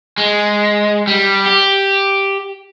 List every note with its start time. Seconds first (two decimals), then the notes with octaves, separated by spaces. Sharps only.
0.18 G#3
1.07 G3
1.46 G4